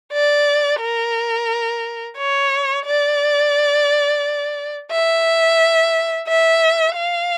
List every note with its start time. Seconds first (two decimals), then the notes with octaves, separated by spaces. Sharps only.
0.13 D5
0.81 A#4
2.18 C#5
2.86 D5
4.92 E5
6.28 E5
6.96 F5